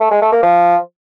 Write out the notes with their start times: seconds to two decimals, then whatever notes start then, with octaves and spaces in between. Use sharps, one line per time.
0.01 A3
0.11 G#3
0.22 A3
0.32 A#3
0.43 F3